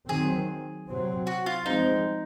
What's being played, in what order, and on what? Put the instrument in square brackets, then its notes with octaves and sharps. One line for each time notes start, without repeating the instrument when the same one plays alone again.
[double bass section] D#3 F#3 C4 [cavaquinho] G#4
[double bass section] C3 F#3 C4
[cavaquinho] F#4
F4
[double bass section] F3 G#3 C4 [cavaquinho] D#4